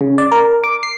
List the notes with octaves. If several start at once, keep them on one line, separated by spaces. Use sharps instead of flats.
C#3
D5
A#4
D6
C7